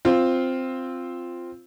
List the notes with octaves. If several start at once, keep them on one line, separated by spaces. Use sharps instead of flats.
C4 F4